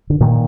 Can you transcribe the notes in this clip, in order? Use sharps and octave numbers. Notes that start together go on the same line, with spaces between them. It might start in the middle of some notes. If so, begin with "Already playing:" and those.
D3
A#2 D#3